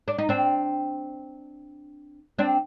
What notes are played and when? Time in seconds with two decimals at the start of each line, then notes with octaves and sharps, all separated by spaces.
0.08 D4
0.18 D#4
0.29 C4 D4
2.39 C4 D4